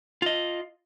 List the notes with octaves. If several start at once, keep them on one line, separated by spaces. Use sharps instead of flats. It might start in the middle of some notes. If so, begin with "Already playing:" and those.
F4 D#5